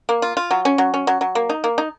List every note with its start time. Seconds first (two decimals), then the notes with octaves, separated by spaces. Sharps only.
0.09 A#3
0.22 F4
0.37 F4
0.51 F#3
0.65 C#4
0.78 F#3
0.94 C#4
1.07 F#3
1.21 F#3
1.35 A#3
1.50 D#4
1.64 A#3
1.78 D#4